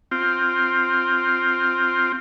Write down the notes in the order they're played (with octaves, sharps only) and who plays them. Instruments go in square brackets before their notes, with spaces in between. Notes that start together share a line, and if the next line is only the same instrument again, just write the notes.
[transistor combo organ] C4 F4